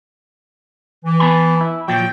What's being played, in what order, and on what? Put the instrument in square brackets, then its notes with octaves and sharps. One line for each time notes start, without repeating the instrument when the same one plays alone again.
[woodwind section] E3
[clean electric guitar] B3 A5 B5
E4
[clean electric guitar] A#2 F3 F#3 [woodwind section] G5